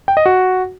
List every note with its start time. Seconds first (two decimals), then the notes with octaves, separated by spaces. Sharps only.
0.08 G5
0.17 D#5
0.26 F#4